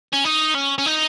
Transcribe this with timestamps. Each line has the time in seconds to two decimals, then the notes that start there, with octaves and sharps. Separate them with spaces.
0.13 C#4
0.25 D#4
0.55 C#4
0.78 C#4
0.86 D#4